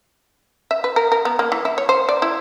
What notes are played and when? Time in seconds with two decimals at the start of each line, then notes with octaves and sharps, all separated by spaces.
0.71 E5
0.84 B4
0.96 A#4
1.12 A#4
1.25 B3
1.39 A#3
1.52 E3
1.65 E4
1.78 C#5
1.89 C5
2.09 D5
2.22 E4